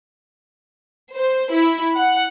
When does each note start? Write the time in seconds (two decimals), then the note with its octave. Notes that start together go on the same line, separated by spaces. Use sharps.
1.15 C5
1.53 E4
1.96 F#5